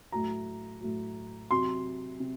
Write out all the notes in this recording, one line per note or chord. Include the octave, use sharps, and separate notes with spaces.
A2 F#3 A#5
A2 F#3
C3 F#3 C6
C3